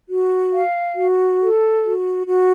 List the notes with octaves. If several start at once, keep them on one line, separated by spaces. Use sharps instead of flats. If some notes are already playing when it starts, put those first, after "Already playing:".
F#4
F5
F#4
A4
F#4
F#4